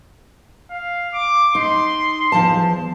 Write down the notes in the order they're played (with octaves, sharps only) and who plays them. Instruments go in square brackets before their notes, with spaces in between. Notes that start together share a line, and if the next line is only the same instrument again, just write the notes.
[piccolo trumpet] F5
D6
[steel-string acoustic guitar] D#4 [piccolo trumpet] C6
[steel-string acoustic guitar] E2 F3 A5